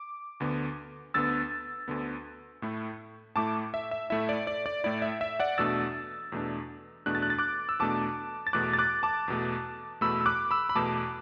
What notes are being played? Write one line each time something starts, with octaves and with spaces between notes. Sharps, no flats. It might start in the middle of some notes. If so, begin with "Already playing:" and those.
Already playing: D6
D2 D3 B3
D2 D3 B3 E6 A6
D2 D3 B3
A2 A3 E4
A2 A3 E4 A5 D6
E5
E5
A2 A3 E4 E5
D5
D5
D5
A2 A3 E4 D5
E5
E5
D5 F#5
E2 B2 A3 D4 E6 A6
E2 B2 A3 D4
E2 B2 A3 D4 F#6
A6
F#6
A6
D6 F#6
E6
E2 B2 A3 D4 A5 D6
A6
E2 B2 A3 D6 F#6
A6
D6 F#6
A5 D6
E2 B2 A3
E2 B2 A3 B5 E6
E6
D6 F#6
B5 E6
B5
E2 B2 A3 A5 D6